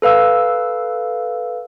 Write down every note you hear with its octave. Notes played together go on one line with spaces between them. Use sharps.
A4 B4 F5 E6